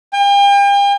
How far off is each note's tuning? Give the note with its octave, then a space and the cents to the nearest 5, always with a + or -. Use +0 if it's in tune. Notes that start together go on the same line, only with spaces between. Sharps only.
G5 +40